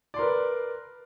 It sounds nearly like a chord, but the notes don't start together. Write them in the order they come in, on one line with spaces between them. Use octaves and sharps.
D5 C6 A#4 B4